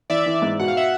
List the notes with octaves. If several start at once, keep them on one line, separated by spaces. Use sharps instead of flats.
E3 D5 E5
E3
G#2
B2 F#5
F5
E5 F#5